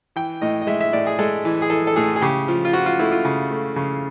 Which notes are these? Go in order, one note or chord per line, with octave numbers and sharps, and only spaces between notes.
E3 G5
A2 D#5
D#5
G#3 E5
E5
A2 D5
G#4
G#3 A4
E3
G#4
E3 A4
A4
A2 G#4
G#4
C#3 G4
F3
F4
F3 F#4
F4
A3 E4
F4
C#3
A3
C#3